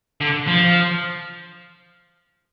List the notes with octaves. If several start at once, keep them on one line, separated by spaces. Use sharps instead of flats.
D3
F3